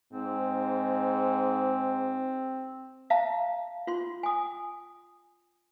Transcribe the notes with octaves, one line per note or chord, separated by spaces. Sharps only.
G#2 C4
E5 F5 A5 A#5
F4 C6
G#5 D#6